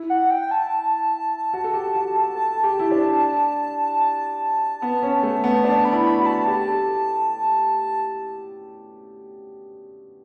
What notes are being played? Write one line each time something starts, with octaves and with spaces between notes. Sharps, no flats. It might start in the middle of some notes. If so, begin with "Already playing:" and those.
Already playing: E4
F#5
G5
G5
A5
F#4
A4
G4
F#4
A4
A4 A5
G4
E4
D4
A5
B3
C#4
A3
B3
D4 A5
B5
E4
B5
F#4
A5
G4 A5
A4